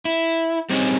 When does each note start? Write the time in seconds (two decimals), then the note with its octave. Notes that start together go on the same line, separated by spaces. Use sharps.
0.05 E4
0.70 G3 C4 C#4 D#4 G#4